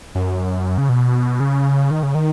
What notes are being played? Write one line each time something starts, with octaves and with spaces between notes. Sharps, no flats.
F#2
C#3
B2
C#3
D#3
C#3
D#3